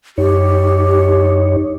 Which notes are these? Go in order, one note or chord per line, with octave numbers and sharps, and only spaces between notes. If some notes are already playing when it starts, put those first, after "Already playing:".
F#2 D#4 G4 C#5